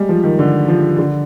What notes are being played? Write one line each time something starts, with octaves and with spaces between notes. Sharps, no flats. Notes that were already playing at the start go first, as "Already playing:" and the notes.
Already playing: G3 G#3
F3
D#3
D3
F3
D3